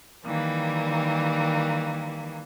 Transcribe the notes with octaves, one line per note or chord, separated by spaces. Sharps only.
D#3 E3 G3 A#3